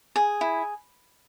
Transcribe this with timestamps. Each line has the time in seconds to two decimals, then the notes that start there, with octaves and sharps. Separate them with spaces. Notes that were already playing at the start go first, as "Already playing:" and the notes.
0.16 G#4
0.41 E4